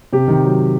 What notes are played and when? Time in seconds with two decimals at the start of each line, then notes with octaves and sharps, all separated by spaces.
0.13 C3 G4
0.28 D#3
0.44 F#3